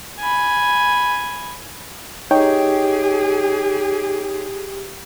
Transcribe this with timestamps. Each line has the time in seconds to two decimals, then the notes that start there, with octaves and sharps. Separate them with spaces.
0.19 G#5 B5
2.31 D#4 G4 G#4 C#5 G5